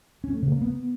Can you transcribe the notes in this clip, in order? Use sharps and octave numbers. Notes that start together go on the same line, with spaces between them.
C#4
A3
C#3
A#3
B3